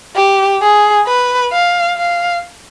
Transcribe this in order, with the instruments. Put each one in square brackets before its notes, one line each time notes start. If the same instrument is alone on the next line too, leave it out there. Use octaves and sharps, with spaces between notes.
[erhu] G4
G#4
B4
F5
F5